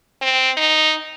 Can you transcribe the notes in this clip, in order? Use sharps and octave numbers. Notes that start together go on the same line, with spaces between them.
C4
D#4